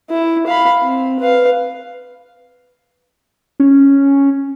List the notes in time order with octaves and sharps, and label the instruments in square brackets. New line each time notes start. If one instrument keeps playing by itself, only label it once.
[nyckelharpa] E4
F5 B5
C4
B4 F5
[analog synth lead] C#4